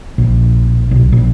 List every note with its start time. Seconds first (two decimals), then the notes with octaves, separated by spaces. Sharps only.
0.18 A#1
0.91 B1
1.12 A#1